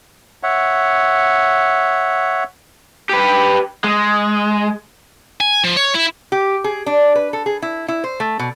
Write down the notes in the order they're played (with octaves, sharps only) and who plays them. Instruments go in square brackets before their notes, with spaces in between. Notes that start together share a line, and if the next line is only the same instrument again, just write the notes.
[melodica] C#5 E5 F#5
[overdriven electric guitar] G4 B4
G#3
[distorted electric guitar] G#5
F3
C#5
E4
[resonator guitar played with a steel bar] G4
G#4
D4
B4
A4
G#4
E4
E4
C5
A3
B2